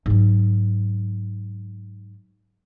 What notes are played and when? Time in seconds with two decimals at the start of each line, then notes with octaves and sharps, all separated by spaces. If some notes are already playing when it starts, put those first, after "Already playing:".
0.06 G#2 F#3